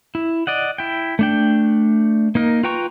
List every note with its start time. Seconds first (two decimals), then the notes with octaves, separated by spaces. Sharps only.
0.15 E4
0.47 D5 D#5 F#5
0.78 E4 G5
1.19 A3 D4 G5
2.35 A#3 D#4 A#4
2.63 F4 B4 G5 A#5 C#6